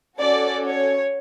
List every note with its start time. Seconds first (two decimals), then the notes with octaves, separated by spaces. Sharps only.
0.19 C#4 F#4 A4 D5
0.66 C#5